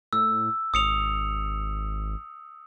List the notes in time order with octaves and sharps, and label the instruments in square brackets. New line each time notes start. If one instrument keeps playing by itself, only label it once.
[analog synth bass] A2 [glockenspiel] E6
[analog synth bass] G#1 [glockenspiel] D#6 C#7 F7